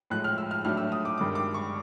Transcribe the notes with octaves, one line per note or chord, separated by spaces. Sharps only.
A2 F3 G#3 F#6
F6
E6
F6
A2 F#3 A3 D4 F6
E6
D#6
D6
G2 D#3 G#3 D6
D6
C#6